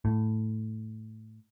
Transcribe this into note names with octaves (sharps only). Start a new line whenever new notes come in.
A2